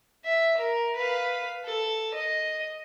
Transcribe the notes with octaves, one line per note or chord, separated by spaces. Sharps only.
E5
A#4
B4 F5
A4
D#5